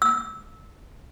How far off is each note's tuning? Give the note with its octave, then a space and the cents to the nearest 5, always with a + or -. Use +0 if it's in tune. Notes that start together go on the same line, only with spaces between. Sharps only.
E6 -20